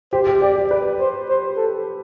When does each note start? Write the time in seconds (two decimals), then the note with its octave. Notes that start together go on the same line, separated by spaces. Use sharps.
0.13 G4 C5
0.27 G4
0.42 G4 D5
0.56 G4
0.70 B4 D5
1.00 C5
1.29 C5
1.57 A4